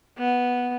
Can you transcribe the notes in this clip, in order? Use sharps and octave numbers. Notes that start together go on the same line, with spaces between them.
B3